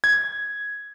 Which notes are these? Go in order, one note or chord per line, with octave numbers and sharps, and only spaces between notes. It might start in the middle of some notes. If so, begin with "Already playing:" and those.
G#6